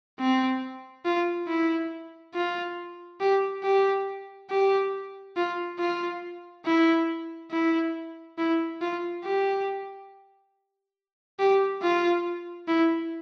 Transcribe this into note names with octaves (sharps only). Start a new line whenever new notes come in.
C4
F4
E4
F4
G4
G4
G4
F4
F4
E4
E4
E4
F4
G4
G4
F4
E4